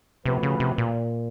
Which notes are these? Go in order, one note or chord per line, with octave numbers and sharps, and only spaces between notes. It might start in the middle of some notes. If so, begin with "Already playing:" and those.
C3 F3 A3 C#4 F#4 B4
C#3
C3
A#2